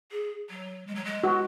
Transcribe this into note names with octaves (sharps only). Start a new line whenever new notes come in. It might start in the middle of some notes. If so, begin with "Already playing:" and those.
G#4
F#3
G#3
F#3
G#3
F#4